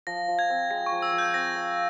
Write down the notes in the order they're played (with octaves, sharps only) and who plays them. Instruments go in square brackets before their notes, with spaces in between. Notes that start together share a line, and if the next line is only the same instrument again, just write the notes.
[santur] F3 [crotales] A#6
[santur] F3
[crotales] G#6
[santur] C4
[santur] G#3 [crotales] A#6
[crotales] C#6
[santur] F3
[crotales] E6
[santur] F3
[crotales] G6
[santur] C4 [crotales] A#6
[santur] F5